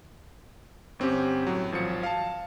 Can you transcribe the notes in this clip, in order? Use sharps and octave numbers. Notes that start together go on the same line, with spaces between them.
G1 C4 C#4 G4
A2 F#3
G#1 F3 F#3 C#7
F5 A5